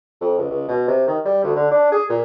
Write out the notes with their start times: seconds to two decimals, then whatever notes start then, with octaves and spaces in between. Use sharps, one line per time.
0.21 F2
0.38 C#2
0.50 C#2
0.68 B2
0.88 C3
1.07 D#3
1.25 G3
1.43 D2
1.56 D3
1.71 D4
1.92 G#4
2.10 A#2